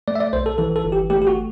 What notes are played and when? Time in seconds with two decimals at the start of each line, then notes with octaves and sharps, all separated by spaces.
0.08 A3 D5
0.15 E5
0.20 D5
0.33 B1 C5
0.46 A4
0.58 E3 A4
0.76 A4
0.84 G1
0.92 G4
1.10 A3 G4
1.22 G4
1.27 F#4